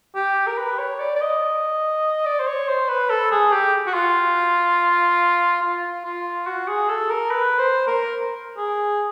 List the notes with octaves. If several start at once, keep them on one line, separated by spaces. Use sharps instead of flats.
G4
A#4
B4
C#5
D5
D5
D#5
D5
C5
C#5
C5
B4
A4
G#4
G4
F#4
F4
F4
F4
F#4
G#4
A4
A#4
B4
C5
A#4
G#4